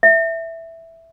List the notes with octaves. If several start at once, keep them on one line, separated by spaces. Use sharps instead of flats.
E5